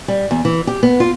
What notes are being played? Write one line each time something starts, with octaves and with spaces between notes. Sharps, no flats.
G3
E2
E3
G4
B3
F4